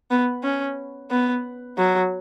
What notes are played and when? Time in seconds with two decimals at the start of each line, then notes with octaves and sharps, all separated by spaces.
0.11 B3
0.43 C#4
1.11 B3
1.78 F#3